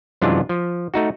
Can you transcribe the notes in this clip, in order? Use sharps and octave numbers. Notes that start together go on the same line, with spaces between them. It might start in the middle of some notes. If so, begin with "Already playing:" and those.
F#2 C3 E3 G#3 D4 F4
F3
A3 D#4 F#4